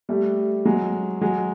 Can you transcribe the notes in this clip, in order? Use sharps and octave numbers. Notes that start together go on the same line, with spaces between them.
G3 A3
F#3 G#3
F#3 G#3